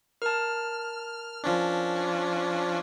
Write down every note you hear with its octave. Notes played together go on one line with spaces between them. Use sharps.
A#4 A5 F6
F3 C#4 D4